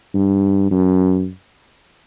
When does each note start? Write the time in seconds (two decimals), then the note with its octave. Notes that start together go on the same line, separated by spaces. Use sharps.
0.14 G2
0.71 F#2